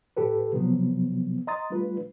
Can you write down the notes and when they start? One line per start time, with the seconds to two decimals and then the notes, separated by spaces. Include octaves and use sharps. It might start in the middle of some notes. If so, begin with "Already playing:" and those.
0.17 A2 G4 A4 B4
0.53 C3 F3 F#3 B3
1.47 D#5 A#5 C6 D#6 A6
1.70 G3 A3 D4 F4 B4